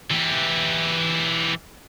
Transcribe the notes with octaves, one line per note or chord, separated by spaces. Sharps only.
E3 G4